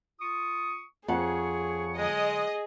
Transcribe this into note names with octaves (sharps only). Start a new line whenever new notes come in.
F4 C#6 D#6
F2 G#4 C#5 F#5 C#6
D3 F#3 G#3 G#4 D#5